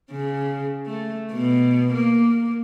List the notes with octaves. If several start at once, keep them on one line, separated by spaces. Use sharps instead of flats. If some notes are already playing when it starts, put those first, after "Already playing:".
C#3
A3
B2
A#3